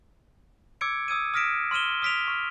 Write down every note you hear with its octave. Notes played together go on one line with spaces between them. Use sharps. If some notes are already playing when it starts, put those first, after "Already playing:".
D6 E6 G#6 C#7 D7
D#6 E6 G#6 D#7
D#6 F6 A#6 B6 D7 E7
C6 F6 D#7 E7 G7
D#6 F6 B6 D7 F7
C#6 F6